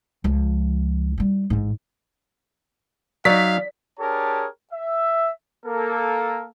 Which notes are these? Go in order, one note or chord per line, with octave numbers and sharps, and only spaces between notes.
C#2 F3
G3 E4
A1 G#2
F#3 D#4 D5 F5 B6
D4 G4 G#4 A#4 C#5 A5
E5
A#3 A4 A#4